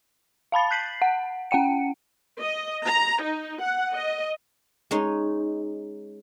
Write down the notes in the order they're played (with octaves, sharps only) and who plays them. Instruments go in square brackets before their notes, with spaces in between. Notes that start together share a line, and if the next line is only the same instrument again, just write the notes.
[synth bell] F5 A5 B5 A6
F#6 G6 B6 C7 F#7
F#5
C#4 F#5 G5 C#7
[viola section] D#5
A#5
D#4
F#5
D#5
[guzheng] G#3 C#4 D#4